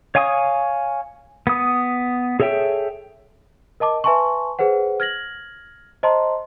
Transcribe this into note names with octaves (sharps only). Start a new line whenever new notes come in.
C#5 F5 G#5 C#6 D#6
B3 D#6
G#4 A4 C#5 E5 G5
A#4 D#5 A5 D6
B4 E5 G#5 A5 C6 C#6
G#4 B4 C5 F#5
F6 G#6 A#6 F#7
C5 D#5 A5 A#5 C6